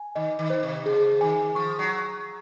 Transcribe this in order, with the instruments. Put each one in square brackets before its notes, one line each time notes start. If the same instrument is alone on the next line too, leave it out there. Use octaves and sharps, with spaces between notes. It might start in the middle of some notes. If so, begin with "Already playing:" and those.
Already playing: [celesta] G#5
[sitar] D#3 [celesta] D#5
[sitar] D#3
[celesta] C5
[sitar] C3
[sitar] C#3 [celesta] G#4
[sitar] D#3 [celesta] G#5
[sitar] F3 [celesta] C#6
[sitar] F#3